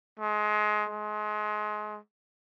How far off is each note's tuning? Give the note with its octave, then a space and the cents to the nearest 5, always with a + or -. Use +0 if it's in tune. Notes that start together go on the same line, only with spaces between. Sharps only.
G#3 +25
G#3 +30